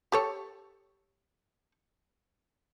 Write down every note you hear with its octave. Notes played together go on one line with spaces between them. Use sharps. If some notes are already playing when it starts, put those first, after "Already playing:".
G4 A4 C#5